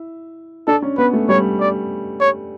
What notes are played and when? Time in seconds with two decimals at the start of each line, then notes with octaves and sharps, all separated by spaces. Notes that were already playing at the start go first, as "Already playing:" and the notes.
Already playing: E4
0.67 D4 A4
0.82 C#4
0.98 B3 B4
1.13 A3
1.29 G3 C#5
1.60 D5
2.20 C#5